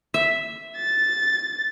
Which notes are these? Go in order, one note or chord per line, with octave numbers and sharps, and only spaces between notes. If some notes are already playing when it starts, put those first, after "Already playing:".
E5
A6